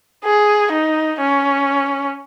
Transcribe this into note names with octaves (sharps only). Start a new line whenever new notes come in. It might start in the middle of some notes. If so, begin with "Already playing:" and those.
G#4
D#4
C#4